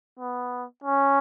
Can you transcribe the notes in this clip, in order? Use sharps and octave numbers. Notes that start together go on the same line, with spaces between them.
B3
C#4